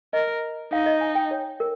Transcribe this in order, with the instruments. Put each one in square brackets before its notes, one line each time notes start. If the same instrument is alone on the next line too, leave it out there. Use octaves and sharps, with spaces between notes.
[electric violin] A#4 [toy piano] D#5
[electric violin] D#4 [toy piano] F5
[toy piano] D#5
G#5
G5
C#5
A#4